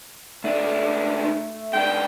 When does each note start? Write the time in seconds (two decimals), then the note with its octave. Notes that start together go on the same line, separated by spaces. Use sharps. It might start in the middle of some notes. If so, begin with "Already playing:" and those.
0.44 C#2 A3 D4
1.73 G#2 D4 G5